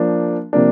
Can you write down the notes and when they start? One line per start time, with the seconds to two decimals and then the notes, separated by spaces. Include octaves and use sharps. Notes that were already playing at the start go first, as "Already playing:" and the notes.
Already playing: F3 A#3 D4
0.53 C3 F3 A#3 D4